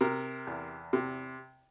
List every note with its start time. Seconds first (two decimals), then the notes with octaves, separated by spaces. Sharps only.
0.01 C3 A#4
0.47 E2
0.93 C3